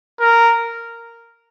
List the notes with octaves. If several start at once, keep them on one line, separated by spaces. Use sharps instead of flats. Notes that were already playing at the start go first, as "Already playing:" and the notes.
A#4